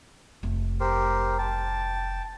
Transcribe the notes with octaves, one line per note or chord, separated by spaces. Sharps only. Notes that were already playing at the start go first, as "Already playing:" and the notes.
F1 A3
G4 A#4 C5
G5 A5